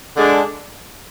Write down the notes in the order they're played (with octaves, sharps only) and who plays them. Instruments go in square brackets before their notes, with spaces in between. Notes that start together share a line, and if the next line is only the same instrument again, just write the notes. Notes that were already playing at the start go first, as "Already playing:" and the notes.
[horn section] D3 G#3 D4